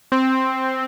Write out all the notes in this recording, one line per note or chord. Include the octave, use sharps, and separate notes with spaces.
C4